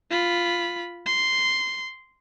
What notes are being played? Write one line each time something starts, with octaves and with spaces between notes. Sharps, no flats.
F4 B5
C6